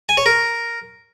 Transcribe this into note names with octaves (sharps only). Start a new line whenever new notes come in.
G#5
C#5
A#4